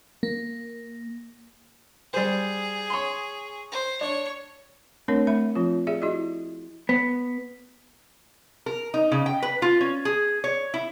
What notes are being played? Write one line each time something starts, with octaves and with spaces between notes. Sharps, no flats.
A#3
G3 G#4 C5
C#5 C6
C5
D4 C#5
A3 C4 D4 A#4 C#5
A3 E5 B5
F3 C4 F4
G4 G#4 D5 E5
E4 F#4 G#4 D#5
B3
A#4
D#4
C#3
G5
B4
F4
C#4
G#4
C#5
E4